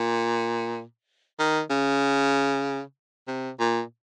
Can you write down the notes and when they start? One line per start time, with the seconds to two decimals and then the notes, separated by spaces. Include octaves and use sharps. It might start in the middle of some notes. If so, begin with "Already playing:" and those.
Already playing: A#2
1.39 D#3
1.70 C#3
3.28 C3
3.60 A#2